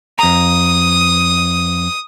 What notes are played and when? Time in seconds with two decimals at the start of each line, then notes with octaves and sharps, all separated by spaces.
0.19 F2 A#5 D#6